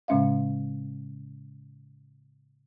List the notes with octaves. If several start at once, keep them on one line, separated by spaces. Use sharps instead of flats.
A2 C#3 G#3 C#4 E5 F5